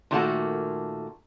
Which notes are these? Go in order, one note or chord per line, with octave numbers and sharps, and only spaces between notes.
A#2 D#3 A3 A#3 F#4 A4